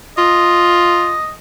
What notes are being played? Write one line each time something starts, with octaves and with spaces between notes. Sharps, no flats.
F4 D#5